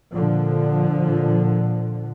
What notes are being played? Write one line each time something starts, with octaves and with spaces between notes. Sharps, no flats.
A#2 D3 F3